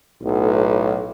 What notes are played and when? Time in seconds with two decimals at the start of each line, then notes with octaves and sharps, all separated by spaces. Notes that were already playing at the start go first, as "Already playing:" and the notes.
0.24 B1 A2